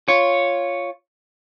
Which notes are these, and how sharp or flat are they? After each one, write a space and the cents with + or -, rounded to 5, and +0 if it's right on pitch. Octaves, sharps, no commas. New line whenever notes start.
F4 +0 C#5 +0